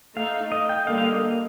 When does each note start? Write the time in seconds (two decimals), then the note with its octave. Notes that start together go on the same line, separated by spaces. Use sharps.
0.16 A3 D#4 A4 F5
0.52 D#5
0.69 G5
0.87 D3 G3 A#3 F5
0.98 F5
1.04 D#5